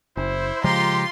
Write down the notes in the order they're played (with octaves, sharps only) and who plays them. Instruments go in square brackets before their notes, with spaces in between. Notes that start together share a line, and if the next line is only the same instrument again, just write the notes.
[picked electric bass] F#1 [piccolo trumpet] E4 [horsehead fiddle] C5
[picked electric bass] C#3 F3 G#3 [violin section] F4 C6 [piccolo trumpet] G4 [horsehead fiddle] A#5